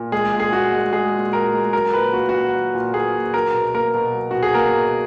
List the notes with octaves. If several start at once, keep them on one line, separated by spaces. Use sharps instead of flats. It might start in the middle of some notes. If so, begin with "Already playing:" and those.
Already playing: A#2
G#3 G#4
A#2
G#4
A#2 F#4
G#3
G#3 G#4
A#2
A#2 A#4
G#3
F#3 A#4
A#2 B4
A#3 F#4
A#2 F#4
F#3
A#2
A#3 G#4
A#2
F#3 A#4
B2
A#3 A#4
B2
F#3
B2 F#4
G#4
A#3 A#4
B2